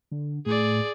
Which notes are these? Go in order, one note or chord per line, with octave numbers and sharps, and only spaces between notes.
D3
A2 G#4 D5